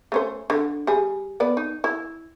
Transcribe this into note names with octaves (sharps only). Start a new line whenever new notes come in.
A3 C#4 C5
D3
G3 G#4
B3 D5
D#4
E4